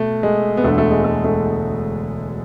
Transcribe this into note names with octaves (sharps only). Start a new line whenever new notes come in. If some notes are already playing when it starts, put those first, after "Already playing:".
Already playing: B2 A3
G#3
B3
E1 D2 D3 A3
A3
G#3
A3
A3